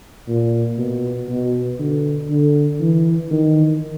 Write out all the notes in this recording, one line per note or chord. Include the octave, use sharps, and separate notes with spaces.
A#2
B2
B2
D3
D3
E3
D#3